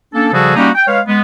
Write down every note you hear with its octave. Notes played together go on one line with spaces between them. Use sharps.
A#3 C#4 D4 A4
C#3 F3 G3 F#4 G#4 A4
G3 A#3 C#4 D#4 F#4 G4
G5
G#3 B4 C#5 F5
G#3 B3